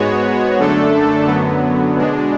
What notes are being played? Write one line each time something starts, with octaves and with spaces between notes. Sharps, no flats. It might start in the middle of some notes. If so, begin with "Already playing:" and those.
Already playing: G#2 G#3 B3 F#4 C#5
F#2 D3 A3 D4 A4
F#2 D3 F#3 B3
B2 G#3 D4